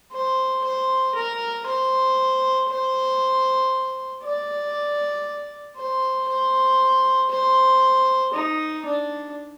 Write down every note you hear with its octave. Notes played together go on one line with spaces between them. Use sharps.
C5
C5
A#4
C5
C5
D5
C5
C5
C5
D#4
D4